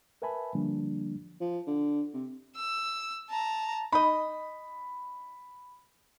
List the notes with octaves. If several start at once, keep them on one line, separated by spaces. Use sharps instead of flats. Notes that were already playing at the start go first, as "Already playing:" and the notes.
A#4 B4 E5 G#5 A5 B5
D3 F3 G3 A#3 D4
F3
D3
C3
E6
A5 A#5
D#4 D#5 B5